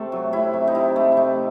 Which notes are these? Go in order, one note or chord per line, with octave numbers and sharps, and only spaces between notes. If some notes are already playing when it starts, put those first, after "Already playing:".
Already playing: C3 A3 A4
F#3
C3 E4
C3
D#4
C3 E4
A3
E4
C3 D#4